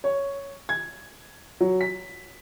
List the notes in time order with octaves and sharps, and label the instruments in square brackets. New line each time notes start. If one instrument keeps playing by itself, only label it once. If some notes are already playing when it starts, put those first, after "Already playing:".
[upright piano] C#5
G#6
F#3
B6